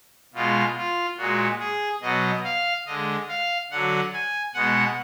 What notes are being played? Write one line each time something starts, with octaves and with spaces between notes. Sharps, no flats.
B2 G#3 F4
F4
A#2 G#3 F#4
G#4
B2 F#3 D#5
F5
D3 G#3 D#5
F5
D3 F#3 F#5
G#5
B2 G#3 F#5